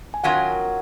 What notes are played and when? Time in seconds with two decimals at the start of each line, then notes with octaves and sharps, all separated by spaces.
0.14 G#5
0.24 D#3 F#3 C#4 F4 A#4 F#5